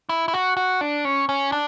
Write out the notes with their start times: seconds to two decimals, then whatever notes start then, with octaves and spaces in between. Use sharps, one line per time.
0.09 E4
0.28 E4
0.34 F#4
0.57 F#4
0.81 D4
1.05 C#4
1.29 C#4
1.52 D4